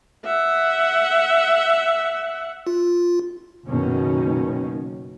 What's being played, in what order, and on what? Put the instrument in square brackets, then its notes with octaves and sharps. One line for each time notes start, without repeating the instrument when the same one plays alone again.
[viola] E5 F#5
[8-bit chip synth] F4
[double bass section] F#1 B2 D#3 C#4